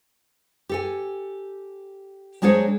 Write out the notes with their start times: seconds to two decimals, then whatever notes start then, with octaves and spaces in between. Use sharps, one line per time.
0.69 G4 A4 G#5
2.42 F#3 G#3 D4 G#4 C5 C#5